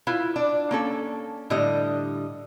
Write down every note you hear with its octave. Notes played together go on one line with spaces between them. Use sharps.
E4 F4 B4
D4 D5
A#3 C#4 A4
A2 D3 G3 D#5